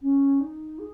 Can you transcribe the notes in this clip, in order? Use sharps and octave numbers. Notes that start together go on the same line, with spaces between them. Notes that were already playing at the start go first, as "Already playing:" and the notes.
C#4
D#4
G#4